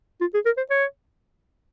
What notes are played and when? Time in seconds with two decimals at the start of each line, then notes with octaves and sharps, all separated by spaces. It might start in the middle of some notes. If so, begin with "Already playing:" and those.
0.21 F4
0.34 G#4
0.45 A#4
0.57 C5
0.70 C#5